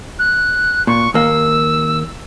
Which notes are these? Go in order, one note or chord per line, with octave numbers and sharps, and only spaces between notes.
F#6
A#2 C#6
D#2 A#3 E6